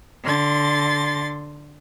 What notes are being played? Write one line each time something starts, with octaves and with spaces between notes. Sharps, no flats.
D3 C6 A6